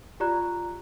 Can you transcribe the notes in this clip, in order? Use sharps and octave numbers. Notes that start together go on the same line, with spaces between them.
F4 G4 D5 A#5 F#6